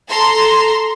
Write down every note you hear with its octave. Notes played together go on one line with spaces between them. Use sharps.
A4 A#5 C6